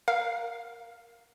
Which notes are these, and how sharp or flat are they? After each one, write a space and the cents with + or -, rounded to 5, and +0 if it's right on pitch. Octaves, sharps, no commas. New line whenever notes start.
A#4 +0 F5 +0